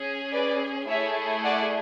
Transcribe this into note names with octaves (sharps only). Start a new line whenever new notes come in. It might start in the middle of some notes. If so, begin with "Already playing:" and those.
Already playing: C#4 G#4
B4 D5
A3 E4 G#4 C#5 E5
D5 F#5